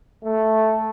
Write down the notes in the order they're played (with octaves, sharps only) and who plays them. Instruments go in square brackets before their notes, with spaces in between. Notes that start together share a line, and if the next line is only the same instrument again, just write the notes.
[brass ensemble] A3